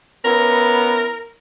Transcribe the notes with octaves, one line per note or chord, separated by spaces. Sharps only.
B3 C#4 E4 A#4